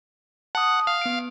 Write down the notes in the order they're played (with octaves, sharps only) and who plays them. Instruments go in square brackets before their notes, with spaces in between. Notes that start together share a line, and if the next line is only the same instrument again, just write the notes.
[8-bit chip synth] F#5 [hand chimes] A5 D#6
[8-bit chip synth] F5
[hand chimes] B3 D7